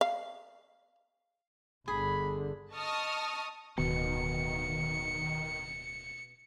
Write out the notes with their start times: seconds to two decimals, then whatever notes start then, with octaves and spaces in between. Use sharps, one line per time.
0.01 F5
1.88 G1 D3 G#4 B5
2.73 D#5 A5 C#6 D#6 F6
3.78 D1 B2 D#3 C#7